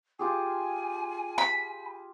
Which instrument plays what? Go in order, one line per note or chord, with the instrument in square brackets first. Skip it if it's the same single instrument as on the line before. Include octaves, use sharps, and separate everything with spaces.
[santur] F4 G4 G#4 [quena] G#5
[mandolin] B5